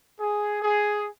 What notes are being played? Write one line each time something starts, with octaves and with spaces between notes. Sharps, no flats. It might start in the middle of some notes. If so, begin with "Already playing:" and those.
G#4
G#4